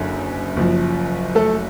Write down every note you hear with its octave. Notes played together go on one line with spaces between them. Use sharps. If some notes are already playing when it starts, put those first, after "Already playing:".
Already playing: F#1 F#2 D3
F#1 F#2 F3
A3 A4